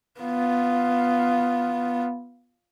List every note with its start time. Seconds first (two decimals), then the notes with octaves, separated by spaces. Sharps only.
0.20 B3 F4